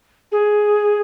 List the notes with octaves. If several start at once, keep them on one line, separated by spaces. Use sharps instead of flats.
G#4